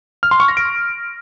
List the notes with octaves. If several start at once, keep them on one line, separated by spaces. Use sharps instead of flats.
F6
C6
C#6
A#6
D7